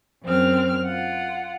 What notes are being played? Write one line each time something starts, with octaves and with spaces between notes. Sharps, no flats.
F#2 C4 F6
F4 F#5